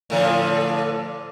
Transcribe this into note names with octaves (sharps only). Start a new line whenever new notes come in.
A2 D3 F3